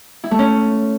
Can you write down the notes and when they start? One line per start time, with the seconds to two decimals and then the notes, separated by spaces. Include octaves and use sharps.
0.24 E4
0.31 A3
0.39 C#4